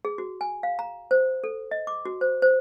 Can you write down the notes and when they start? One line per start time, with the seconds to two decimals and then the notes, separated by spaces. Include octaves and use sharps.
0.05 G#4
0.18 F#4
0.41 G#5
0.63 F5
0.79 A#5
1.11 C5
1.44 A4
1.71 D#5
1.87 D6
2.05 F#4
2.21 C5
2.42 C5